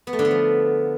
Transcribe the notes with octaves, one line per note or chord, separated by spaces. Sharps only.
B3
A3
D3
B3
F3